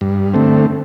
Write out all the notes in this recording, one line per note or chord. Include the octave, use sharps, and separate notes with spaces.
G2
D3 A3 C4